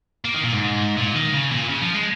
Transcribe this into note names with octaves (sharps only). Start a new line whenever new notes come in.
A#3
D#3
A#2
G#2
A#2
D#3
C#3
A#2
C#3
F3
G#3